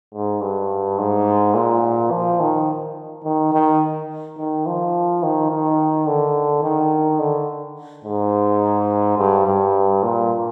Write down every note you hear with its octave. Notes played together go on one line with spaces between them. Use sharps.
G#2
G2
G#2
A#2
F3
D#3
D#3
D#3
D#3
F3
D#3
D#3
D3
D#3
D3
G#2
G2
G2
A#2